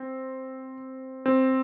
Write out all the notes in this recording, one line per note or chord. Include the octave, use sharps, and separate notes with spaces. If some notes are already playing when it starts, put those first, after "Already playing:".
Already playing: C4
C4